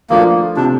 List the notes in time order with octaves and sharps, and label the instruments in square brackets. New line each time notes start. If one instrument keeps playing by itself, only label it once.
[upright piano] F3 A3 D4 F4 [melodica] A#3
[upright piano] C3 [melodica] D4